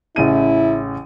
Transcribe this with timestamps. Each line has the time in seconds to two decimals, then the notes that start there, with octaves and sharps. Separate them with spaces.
0.16 A1 C#3 E4 D#7